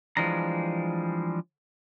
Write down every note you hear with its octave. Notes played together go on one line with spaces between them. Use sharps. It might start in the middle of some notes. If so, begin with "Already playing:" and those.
E3 F3 G3 G#3 D4 A#5